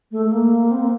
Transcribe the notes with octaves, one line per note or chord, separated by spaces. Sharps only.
A3
A3
A#3
C4
A#3